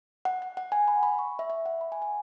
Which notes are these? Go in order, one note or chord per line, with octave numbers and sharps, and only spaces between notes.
F#5
F#5
F#5
G#5
B5
B5
C#6
E5
E5
F#5
B5
G#5
G#5